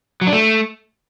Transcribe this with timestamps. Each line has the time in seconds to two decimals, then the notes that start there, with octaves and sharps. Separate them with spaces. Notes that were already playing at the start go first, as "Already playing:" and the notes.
0.21 F#3
0.27 D4
0.33 A3